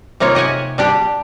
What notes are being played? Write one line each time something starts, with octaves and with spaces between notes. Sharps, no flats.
C3 A#3 D#4 F4 C#5
G4 D#5 F#5 G#5
G3 D4 G4